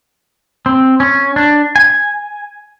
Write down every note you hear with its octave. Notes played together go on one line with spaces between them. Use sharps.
C4
C#4
D4
G#5